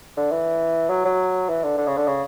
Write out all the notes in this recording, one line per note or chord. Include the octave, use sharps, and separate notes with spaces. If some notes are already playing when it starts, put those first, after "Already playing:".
D3
E3
F#3
F#3
E3
D3
D3
C#3
D3
C#3